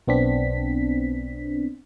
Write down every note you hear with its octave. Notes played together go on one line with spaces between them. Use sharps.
B1 B3 C4 D4 B6